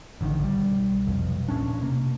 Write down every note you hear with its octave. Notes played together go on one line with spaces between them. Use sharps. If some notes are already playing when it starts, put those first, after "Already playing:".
A1 D3 D#3
B1 G3
F1 B1 F2
E1 A#2 C#4 D4
C3 A#3